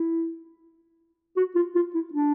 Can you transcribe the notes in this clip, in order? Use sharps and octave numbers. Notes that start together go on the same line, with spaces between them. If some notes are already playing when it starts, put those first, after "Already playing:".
Already playing: E4
F#4
F4
F4
E4
D4